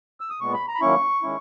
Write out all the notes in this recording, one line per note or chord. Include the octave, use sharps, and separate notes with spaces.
E6
D#6
A#2 G#3 B3 C#6
B5
A#5
B5
D#3 F#3 A#3 C#4 E4 C#6
D#3 G#3 C#4 E4